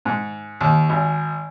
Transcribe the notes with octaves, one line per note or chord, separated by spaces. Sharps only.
G#2
D#2
G#1